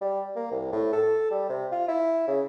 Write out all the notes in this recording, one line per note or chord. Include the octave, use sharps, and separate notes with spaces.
G3
A#3
C2
A2
A4
G3
C3
F4
E4
C#3